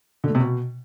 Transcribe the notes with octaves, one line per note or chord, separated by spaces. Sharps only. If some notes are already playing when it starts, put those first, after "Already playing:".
D3
A3
C3
B2